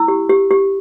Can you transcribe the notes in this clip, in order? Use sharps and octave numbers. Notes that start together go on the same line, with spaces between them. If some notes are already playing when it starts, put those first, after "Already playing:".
Already playing: E4 E6
G4
G4
G4